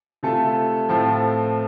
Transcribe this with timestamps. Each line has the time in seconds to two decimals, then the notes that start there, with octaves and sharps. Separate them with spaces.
0.23 C3 A3 F4 A4
0.89 A2 F3 C4 A4